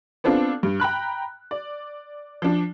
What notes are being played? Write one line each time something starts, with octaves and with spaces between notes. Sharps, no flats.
B3 C4 D4 F4 A4
G2
G5 A#5 B5 F#6
D5
F3 D4